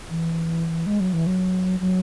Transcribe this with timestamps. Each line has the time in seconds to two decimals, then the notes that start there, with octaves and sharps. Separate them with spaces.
0.09 E3
0.86 G#3
1.00 F#3
1.13 E3
1.27 F#3
1.80 F#3